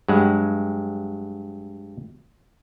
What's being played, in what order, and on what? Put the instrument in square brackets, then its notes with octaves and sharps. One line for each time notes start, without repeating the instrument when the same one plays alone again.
[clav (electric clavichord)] G2 F#3 G#3 F#5